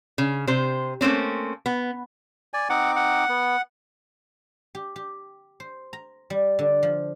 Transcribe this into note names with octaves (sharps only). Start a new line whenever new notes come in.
C#3
C3 C5
A3 A#3 C4 C#4
B3
D5 G#5
C4 D#4 F#5 D6
F#5
B3
G4
G4
C5
A#5
G3
D3
F3